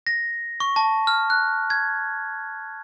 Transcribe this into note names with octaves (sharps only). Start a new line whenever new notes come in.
A#6
C#6
A5
F6
F#6
G#6